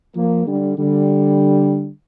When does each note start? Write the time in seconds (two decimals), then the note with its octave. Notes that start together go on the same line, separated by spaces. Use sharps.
0.15 F3 A#3
0.46 D3 G3
0.77 D3 G3